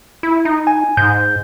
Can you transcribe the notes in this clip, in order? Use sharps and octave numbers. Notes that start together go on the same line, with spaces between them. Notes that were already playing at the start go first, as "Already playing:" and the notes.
E4
D#4
G#5
G#2 G6